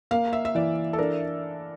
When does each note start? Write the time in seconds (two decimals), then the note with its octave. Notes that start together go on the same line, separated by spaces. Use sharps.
0.11 A#3 F5
0.33 E5
0.45 E5
0.55 E3 D5
0.93 A4
0.98 D4 A#4